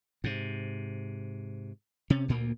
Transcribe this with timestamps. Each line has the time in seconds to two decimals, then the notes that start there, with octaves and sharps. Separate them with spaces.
0.24 G#2 C3
2.10 C3 C#4
2.28 D2 A#2 A#3